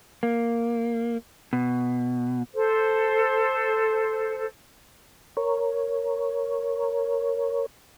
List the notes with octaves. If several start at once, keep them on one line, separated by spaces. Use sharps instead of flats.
A#3
B2
A4 C5
A#4 C#5